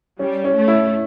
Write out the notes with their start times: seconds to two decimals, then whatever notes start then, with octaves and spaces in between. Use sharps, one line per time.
0.19 G3 C#4
0.44 C#4
0.55 A3
0.68 E4